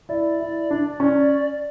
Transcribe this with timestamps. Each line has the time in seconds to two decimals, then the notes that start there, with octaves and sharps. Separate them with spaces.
0.09 E4 D5
0.40 E4
0.71 D4
1.00 C#4